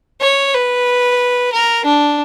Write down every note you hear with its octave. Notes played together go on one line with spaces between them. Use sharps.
C#5
B4
A#4
D4